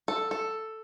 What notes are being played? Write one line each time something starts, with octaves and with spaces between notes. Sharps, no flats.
A4
A4